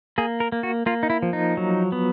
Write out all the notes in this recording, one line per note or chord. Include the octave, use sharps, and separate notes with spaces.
A#3 G#4
A#4
A#3
F#4
A#3 F4
D#4
E4
F3
D#4
F#3
B3